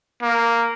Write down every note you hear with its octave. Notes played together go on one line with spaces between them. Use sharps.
A#3